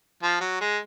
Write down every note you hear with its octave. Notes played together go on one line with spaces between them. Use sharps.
F3
F#3
G#3